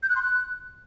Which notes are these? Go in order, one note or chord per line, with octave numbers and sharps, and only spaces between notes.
G6
F#6
C6
F#6